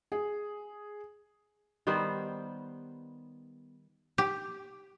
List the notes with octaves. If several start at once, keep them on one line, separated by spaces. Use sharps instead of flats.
G#4
D#3 G3 B3 C5
G4